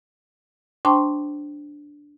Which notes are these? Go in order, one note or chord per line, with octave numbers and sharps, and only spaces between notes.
D4 C5 G5 A5 C6 C#6